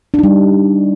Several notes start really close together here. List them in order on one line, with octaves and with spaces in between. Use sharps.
D4 D#4 G3